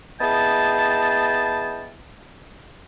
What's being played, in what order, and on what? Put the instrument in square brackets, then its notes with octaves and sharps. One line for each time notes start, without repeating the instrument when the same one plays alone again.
[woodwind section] B3 E4 G#4 D#5 G5 A5